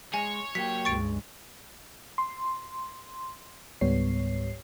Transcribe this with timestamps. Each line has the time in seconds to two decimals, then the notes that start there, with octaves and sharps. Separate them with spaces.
0.14 G#3 C#5 G#5
0.55 F#3 A#3 G4 B6
0.85 C#2 G2 G#3 C#6 A6 D7
2.18 C6
3.81 C#2 G#2 G3 B3 C#5 C7